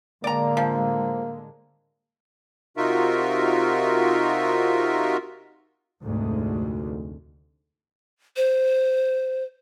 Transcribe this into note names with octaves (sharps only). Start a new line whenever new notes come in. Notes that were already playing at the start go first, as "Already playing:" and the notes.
A2 D3 G#3 A#3 D5 A#5
F3
C3 D#4 F4 F#4 A#4 E5
F1 D2 G#2
C5